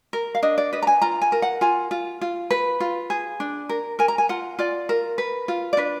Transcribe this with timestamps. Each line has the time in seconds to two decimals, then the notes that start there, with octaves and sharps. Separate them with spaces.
0.13 A#4
0.35 F5
0.43 D4 D#5
0.58 D5
0.73 B4 D#5
0.82 A#5
0.87 G#5
1.02 F4 A#5
1.22 G#5
1.32 A#4
1.42 F#5
1.61 F4 G#5
1.91 F4
2.21 F4
2.51 B4
2.80 F4
3.10 G#4
3.40 D4
3.69 A#4
3.99 A#4 G#5
4.08 A#5
4.18 G#5
4.29 F4 F#5
4.59 F4 D5
4.89 A#4
5.18 B4
5.48 F4
5.73 D5
5.77 D4 B4